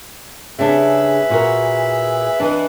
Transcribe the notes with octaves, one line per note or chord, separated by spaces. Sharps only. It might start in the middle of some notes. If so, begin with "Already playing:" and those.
C#3 G3 D4 G#4 B4 E5
A#2 F#4 A#4
E3 D4 B4 D#5